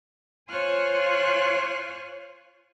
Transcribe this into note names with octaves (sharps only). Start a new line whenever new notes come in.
F4 C5 C#5 G#5 F6 F#6